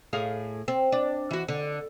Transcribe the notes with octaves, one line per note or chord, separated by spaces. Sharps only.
A2 G#4 F5
C4
D4
E3 F#4
D3